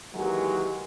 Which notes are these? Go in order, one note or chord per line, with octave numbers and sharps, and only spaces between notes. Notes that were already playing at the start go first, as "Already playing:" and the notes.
D#3 E3 F#3 G#3 A#3 G4